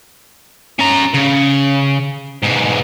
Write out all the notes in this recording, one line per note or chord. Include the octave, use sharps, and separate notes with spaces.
C#4 A#5
C#3
G#2 B2